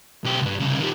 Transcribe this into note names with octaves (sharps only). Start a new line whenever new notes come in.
B1 G4
C#2 G2
C2 C#3
D#3 G3